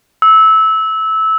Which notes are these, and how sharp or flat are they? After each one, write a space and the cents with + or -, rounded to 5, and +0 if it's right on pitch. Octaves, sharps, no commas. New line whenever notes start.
E6 -20